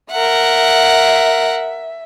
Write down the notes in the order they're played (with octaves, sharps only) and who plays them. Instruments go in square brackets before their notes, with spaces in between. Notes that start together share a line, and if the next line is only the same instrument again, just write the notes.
[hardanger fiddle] A#4 F#5 [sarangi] E5